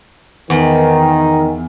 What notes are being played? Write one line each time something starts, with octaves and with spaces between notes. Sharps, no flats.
E2 D#3